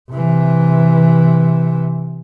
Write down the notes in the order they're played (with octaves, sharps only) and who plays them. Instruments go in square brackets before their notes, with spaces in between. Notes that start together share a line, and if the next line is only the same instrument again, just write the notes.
[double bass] C3 E3